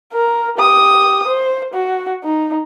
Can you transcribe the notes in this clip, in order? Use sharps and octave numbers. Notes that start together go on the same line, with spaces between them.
A#4
G4 D#6
C5
F#4
D#4